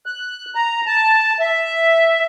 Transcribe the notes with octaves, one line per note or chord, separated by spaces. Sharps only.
F#6
A#5
A5
E5